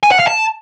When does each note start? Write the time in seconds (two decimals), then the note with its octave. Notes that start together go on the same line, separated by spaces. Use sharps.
0.03 G#5
0.11 F#5
0.19 F5
0.27 A5